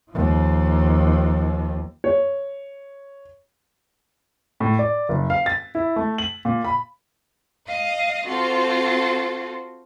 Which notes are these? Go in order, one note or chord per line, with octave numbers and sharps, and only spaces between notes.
D#2 F3
C#5
A2
D5
F#1
F5
A6
E4
A3
F#7
A#2
B5
D#5 F5 D#6
C4 F4 F#4 A4 C5